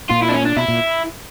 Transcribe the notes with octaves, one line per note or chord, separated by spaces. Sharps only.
A#2 F4
E4
D4
C#4
D4
B2 E4
A#2